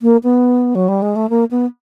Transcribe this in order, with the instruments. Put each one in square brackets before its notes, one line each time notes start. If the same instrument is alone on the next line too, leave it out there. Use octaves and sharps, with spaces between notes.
[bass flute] A#3
B3
F#3
G3
G#3
A3
A#3
B3